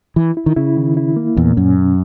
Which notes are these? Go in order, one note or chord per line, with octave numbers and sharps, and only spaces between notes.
E3 E4
E4
D#3
C#3 E4
D#3
E4
A#3
E2 A#2
F#2 C#4
B2